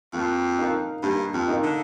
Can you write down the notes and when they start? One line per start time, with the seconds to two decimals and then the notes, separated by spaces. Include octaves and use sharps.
0.13 F2 A#3
0.59 D#4 A#4 F5
1.03 G2 A#3
1.34 F2
1.48 D#4 A#4 F5
1.63 D3